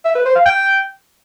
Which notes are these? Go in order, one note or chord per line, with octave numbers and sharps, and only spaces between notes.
E5
B4
C5
F5
G5